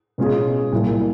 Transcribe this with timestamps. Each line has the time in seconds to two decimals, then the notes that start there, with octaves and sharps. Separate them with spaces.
0.18 B2 G#3 C#4 F4 G#4
0.73 C2 A#2 F#3